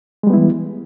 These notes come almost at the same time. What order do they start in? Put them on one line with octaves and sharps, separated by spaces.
G#3 G3 B3 E4 E3